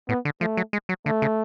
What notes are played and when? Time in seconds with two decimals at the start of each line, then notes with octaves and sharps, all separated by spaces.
0.09 A2 B3
0.25 D3
0.41 F3 A3
0.57 F#3
0.73 G#3
0.89 F#3
1.06 D3 A3
1.22 C#3